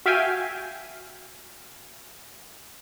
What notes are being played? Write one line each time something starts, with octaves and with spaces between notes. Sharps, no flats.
F#4 E5 F5 G5 G#5